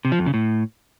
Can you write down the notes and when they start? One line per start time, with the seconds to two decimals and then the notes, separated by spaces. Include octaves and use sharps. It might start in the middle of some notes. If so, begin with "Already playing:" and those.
0.05 C3
0.12 F3
0.19 F2
0.26 C#3
0.34 A2